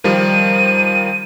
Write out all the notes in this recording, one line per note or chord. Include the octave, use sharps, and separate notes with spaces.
D#3 F3 G3 D#7